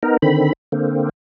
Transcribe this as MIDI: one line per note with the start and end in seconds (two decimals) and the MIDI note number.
0.03 0.17 59
0.03 0.17 63
0.03 0.17 70
0.22 0.53 50
0.22 0.53 51
0.22 0.53 60
0.22 0.53 83
0.72 1.09 50
0.72 1.09 58
0.72 1.09 60